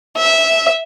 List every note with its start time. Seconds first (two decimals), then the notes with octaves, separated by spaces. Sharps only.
0.16 E5